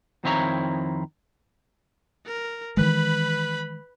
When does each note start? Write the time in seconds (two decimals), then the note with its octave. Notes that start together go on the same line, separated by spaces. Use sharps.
0.24 F2 D#3 C4 E4 C#5 A#5
2.26 A#4
2.77 D#3 E3 G#3 B4 B5